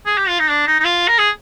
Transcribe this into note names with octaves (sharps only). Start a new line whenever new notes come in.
G#4
G4
F4
D#4
D4
D#4
D#4
F4
A#4
G#4